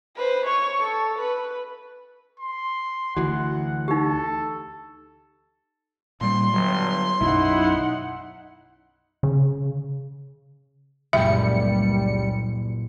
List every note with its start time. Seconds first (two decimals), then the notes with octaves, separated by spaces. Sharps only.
0.16 B4 C5
0.46 C#5 C#6
0.83 A4
1.19 B4
2.40 C6
3.17 D2 E3 F#4 F#5
3.88 D#4 G4 A4
6.21 A#2 G3 C6
6.53 G1 F#3
7.21 B1 F#2 F#3 D#4 E4 F#5
9.23 C#3
11.13 F#1 C#2 A#2 G3 E5 G5 C#7